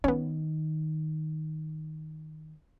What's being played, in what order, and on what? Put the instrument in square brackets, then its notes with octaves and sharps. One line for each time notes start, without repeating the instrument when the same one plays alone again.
[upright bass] D#3 [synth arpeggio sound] B3 C#4